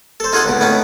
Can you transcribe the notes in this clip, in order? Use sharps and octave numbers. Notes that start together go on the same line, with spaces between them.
A4 C5
D#4 F4 G#4 A4 F#5 C6
C#2 B2
A2 B3 C#4 D#4